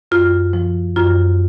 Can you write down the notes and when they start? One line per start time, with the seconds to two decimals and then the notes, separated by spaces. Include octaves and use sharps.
0.11 F#2 F4
0.53 F3
0.96 F#2 F4